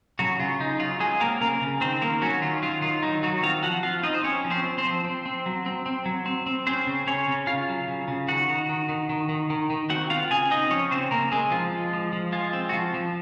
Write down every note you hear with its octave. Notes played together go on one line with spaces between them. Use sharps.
C#3 F#3 F#4
C#3 F4
C#3 D#4
F#3 F4
F#3 G#3 G#4
A#3 C4 A#4
C#3 A#3 A#4
C#3
D#3 C4 C5
D#3 A#3 A#4
F#3 C#4 F#4
D#3 F4
F#3 F4
D#3 F4
F#3 D#4
D#3 F#3 F#4
C4 F4 F5
F3 F#4 F#5
F3 F4 F5
C4 D#4 D#5
C5
C4 C#4 C#5
F3
C4 C5
C4
C4 C5
F3
C4
C4
F#3
C4
C4
F#3
C4
C4
C4 C#4 C5
C#3
C#3 C#4 C#5
C#3
C#3 F4 F5
F#3
C#3
C#3
D#3 F#4 F#5
D#3
D#3
D#3
D#3
D#3
D#3
D#3
C4 F#4 F#5
C4 F4 F5
C#3 G#4 G#5
C4 D#4 D#5
F3 C#4 C#5
C#3 C4 C5
C#3 A#3 A#4
G#3 C4 G#4
F3 F4
G#3
F3
F3
G#3 F4
C4
F#4
F3 F4
F3